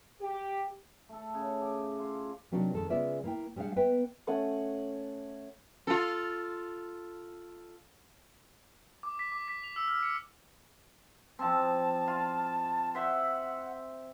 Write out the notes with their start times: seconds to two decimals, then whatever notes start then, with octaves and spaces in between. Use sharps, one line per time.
0.21 G4
1.09 A3 A4
1.34 C#3
1.61 G4
1.99 F4
2.52 C3 F#3 A#3 D4 D#4 F#4
2.75 F2 D#3 G#3 A4
2.90 C#3 G#3 B3 F4 D5 E5
3.24 A#3 E4 G5
3.56 G3 G#3 D4 D5 F5 F#5
3.76 A#3 B3 B4 E5 G5
4.27 A3 C#4 F#5 D#6
5.87 F4 A4
9.03 D6
9.19 B6
9.32 D6
9.48 B6
9.63 F7
9.76 E6
9.88 F6
10.03 C#7
11.39 F3 C4 A5
12.07 F4
12.95 C5 E5 F#5